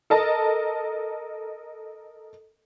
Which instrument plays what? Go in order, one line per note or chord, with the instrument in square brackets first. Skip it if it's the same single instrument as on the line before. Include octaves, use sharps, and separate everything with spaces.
[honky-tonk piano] A4 A#4 D#5 A5